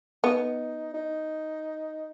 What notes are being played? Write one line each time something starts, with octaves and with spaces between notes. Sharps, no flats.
B3 D#4
D#4